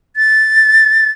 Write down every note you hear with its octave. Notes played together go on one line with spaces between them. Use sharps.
A6